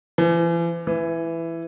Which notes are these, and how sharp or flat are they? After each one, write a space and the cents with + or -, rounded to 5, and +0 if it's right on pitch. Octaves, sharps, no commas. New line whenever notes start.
E3 +40
E3 +10